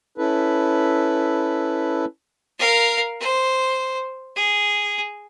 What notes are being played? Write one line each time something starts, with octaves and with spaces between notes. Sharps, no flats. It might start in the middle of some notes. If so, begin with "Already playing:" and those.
C#4 E4 A4 B4
A#4 F5
C5
G#4